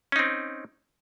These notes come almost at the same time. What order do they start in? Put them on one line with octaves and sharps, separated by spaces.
C#4 D#4 C4